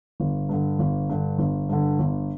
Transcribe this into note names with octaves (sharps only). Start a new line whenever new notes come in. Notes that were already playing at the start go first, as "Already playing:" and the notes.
G1
G2 D3
G1
G2 D3
G1
G2 D3
G1